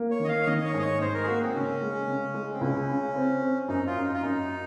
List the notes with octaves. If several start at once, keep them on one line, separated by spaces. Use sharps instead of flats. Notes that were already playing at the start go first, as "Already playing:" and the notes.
Already playing: A#3
C#5
D#3 D#5
F5
C#5
D#3 D#5
D#5
C#5
G#2 D#5
C#5
G#2 C5
A#4
G#4
A#3 F#4
C4
C#3 C#4
G#3
C#3
G#3
C4
C#2 C#4
C#3
C4
C4
F#2 D#4
F4
F#2
D#4
F4
F#2 D#4